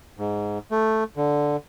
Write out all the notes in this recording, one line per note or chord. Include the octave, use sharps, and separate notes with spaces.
G#2
A3
D3